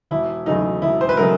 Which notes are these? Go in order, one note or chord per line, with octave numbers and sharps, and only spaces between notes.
E1 E4
E2 C#3 F#3 A3 D#4
E1 E4
C5
B4
C#3 F#3 A3 A#4